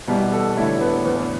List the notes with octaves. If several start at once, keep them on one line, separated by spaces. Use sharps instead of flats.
B2 E3 G3
A4
A2 D3 E4
B3
E2